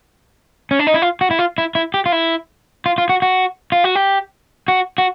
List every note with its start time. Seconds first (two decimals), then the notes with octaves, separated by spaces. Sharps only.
0.71 C#4
0.79 D4
0.87 D#4
0.94 E4
1.02 F4
1.21 F#4
1.31 E4
1.39 F4
1.58 E4
1.75 E4
1.94 G4
2.06 F4
2.12 E4
2.86 F4
2.98 F4
3.09 F#4
3.22 F#4
3.72 F4
3.84 F#4
3.96 G4
4.68 F#4
4.98 F#4